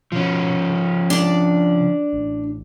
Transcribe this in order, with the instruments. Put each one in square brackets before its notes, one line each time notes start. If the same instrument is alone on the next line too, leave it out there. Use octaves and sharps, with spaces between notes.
[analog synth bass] B2 [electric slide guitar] F3 C#4
[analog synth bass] C#3
[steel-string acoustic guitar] D4 D5
[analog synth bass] A1